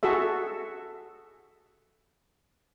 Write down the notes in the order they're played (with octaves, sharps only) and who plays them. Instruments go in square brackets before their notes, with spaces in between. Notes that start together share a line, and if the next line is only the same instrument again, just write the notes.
[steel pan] F#4 G#4 A4 E5